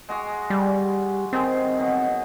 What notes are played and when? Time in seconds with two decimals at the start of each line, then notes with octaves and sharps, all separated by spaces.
0.09 G#3 F#4 G#4
0.50 G3
1.33 D#3 C4 G#4
1.79 B2 F#3